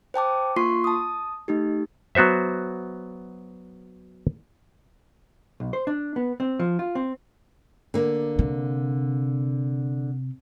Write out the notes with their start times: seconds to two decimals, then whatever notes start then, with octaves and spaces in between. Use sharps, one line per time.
0.14 C5 G5 A5 D6
0.56 A#3 F4 C6 C#6 C7
0.84 A5 D#6
1.48 A3 D#4 G4
2.15 F#3 B3 F#4 C5 E5
5.60 B1
5.73 C5
5.87 D4
6.16 B3
6.40 C4
6.59 F3
6.79 F4
6.95 C4
7.94 D3 A#3
8.39 C3